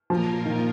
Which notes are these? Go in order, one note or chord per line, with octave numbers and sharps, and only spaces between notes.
A#2 F3 A#3 F4 A#4
D#3